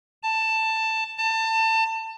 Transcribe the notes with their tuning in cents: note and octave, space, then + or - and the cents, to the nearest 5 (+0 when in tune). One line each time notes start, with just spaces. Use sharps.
A5 +10
A5 +25